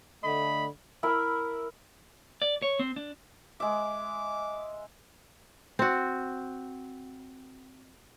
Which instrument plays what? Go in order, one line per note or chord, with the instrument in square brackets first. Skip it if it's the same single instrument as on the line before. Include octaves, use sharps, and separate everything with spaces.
[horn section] D3 A3 D#5 B5
[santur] E4 A#4 E5 B5
[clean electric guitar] D5
C#5
C4
D4
[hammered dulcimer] G#3 E5 [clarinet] D6
[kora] C4 F#4